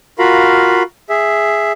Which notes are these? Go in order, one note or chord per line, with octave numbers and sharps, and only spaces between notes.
F4 F#4 A#4 F5 B5
G#4 E5